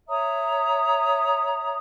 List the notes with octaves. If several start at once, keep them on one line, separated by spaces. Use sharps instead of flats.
C#5 E5 A#5 D#6